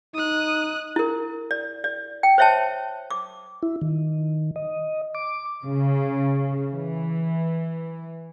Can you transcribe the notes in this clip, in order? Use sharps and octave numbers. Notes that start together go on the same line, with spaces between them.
D#4 D#6 F#6
E4 A#4
D5
D5
G5
C5 C#5 E5 G5 A5
D6
E4
D#3
D#5
D6
C#3
E3